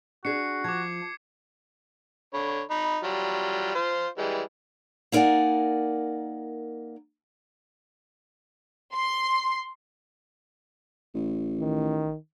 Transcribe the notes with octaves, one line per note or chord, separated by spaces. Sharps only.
D4 F#4 G#4 C7 C#7
F3 D6 G#6
D3 C#5 B5
D#4 B5
F#3 G3 F4
F4 C5
E3 G3 G#3
A#3 D#4 A#4 D5 F#5 G#5
C6
A1
D#3